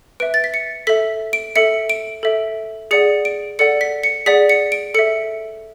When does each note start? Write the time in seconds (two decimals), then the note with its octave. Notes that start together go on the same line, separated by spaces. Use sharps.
0.20 B4 E5 D7
0.34 A6
0.44 B6
0.54 C#7
0.87 A4 E5 B6
1.33 D7
1.56 A4 E5 C#7
1.90 D7
2.23 A4 E5
2.91 G#4 D5 F#5 C#7
3.25 D7
3.59 A4 D5 F#5 C#7
3.81 B6
4.04 C#7
4.26 G#4 D5 F#5 B6
4.49 C#7
4.72 D7
4.94 A4 E5 C#7